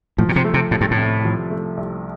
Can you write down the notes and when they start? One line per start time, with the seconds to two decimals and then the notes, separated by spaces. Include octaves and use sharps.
0.18 A2 F3
0.29 A#2
0.36 C3
0.44 A3
0.54 C3
0.71 C2 A2
0.81 G2
0.91 A2
0.97 C3
1.25 F3
1.51 A3
1.77 C2